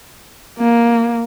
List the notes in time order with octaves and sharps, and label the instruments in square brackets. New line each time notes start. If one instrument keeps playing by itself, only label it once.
[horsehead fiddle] A#3